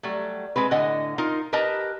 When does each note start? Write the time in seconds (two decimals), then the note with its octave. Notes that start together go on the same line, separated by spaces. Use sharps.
0.03 F#3 G3 A3
0.56 G#3 C4 B4
0.71 A2 D3 D#5 F#5 G#5
1.18 D#4 F4 A#4
1.53 G4 A#4 B4 D#5 A5 A#5